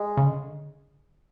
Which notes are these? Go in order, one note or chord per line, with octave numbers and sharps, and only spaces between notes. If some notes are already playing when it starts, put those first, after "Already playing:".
Already playing: G#3
C#3
D3